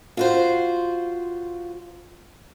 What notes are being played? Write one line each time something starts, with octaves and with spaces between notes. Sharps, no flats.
F4 F#4 C5